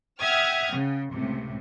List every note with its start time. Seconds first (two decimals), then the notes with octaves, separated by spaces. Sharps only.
0.20 E5 F#5 G5 D#6 F6 G#6
0.74 C#3
1.13 C#2 A2 C3